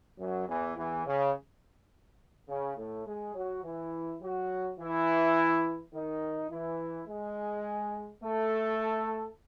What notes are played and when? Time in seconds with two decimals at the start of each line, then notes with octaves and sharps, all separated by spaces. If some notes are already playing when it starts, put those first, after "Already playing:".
0.19 F#2 F#3
0.48 E2 E3
0.77 E2 E3
1.06 C#3
2.49 C#3
2.77 A2 A3
3.06 G#3 G#4
3.35 F#3 F#4
3.64 E3 E4
4.21 F#3 F#4
4.79 E3 E4
5.93 D#3 D#4
6.50 E3 E4
7.07 G#3 G#4
8.23 A3 A4